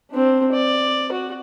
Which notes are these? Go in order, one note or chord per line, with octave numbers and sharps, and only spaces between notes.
C4 D4
D5
F#4